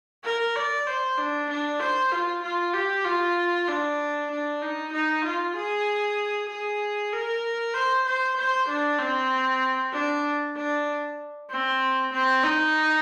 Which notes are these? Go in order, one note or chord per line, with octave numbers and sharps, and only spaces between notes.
A#4
D5
C5
D4
D4
C5
F4
F4
G4
F4
D4
D4
D#4
D#4
F4
G#4
G#4
A#4
C5
C5
C5
D4
C4
D4
D4
C4
C4
D#4